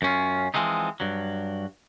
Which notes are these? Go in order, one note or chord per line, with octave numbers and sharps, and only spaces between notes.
F#2 C#4 F4
E3 F3 G#3 C4 D#4
G2 F#3